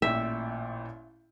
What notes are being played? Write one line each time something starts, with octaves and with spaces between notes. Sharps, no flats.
A1 A#2 E5 G5